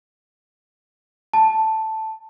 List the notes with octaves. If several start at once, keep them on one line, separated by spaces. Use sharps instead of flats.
A5